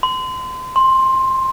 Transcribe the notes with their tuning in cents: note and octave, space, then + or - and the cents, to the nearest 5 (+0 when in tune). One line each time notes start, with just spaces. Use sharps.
C6 -35
C6 +10